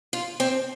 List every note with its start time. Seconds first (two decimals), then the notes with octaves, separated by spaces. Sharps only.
0.13 F4
0.40 C4